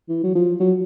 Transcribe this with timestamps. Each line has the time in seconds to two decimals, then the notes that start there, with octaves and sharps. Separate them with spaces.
0.09 E3
0.24 F#3
0.35 F3
0.60 F#3